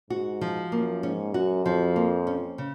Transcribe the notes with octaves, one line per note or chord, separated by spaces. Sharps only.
G#2 F#4
F3
F#2 A#3
G#2 C#4
F#2 F#4
F2 F3
A#3
C#4
C#3